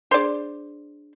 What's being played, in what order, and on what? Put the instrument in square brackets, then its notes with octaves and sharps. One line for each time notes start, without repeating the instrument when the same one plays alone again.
[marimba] D4 G#4 [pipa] C5 D5